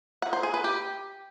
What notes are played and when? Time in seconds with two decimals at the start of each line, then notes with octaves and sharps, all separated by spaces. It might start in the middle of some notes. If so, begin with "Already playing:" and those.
0.22 F#5
0.33 C5
0.43 G#4
0.54 B4
0.64 G4